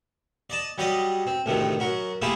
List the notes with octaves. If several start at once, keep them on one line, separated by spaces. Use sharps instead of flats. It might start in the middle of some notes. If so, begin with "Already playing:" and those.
D5 D#5 A5
F#3 G3 G4 D5 D#5
C4
D2 A2 C3 D#3
F#2 F#4 A#4
A3 A#3 E4 F4 G4 G#4